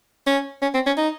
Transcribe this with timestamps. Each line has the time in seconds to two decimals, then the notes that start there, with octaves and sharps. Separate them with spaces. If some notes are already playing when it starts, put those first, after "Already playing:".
0.27 C#4
0.62 C#4
0.74 C4
0.86 C#4
0.97 D#4